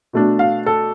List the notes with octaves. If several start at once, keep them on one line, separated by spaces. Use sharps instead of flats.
B2 A3 D4
F5
A4